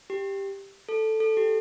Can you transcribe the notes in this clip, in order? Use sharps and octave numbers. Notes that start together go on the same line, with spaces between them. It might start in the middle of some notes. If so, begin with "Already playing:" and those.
G4
A4
A4
G4